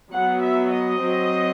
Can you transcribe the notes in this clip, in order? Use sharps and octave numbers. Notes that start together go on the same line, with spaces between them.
F#3 B3 F#5
E5
D#5
F#3 C4